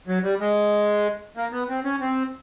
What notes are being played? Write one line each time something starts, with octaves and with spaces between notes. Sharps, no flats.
F#3
G3
G#3
A#3
B3
C4
C#4
C4